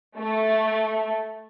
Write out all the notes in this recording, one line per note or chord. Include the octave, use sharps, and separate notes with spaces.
A3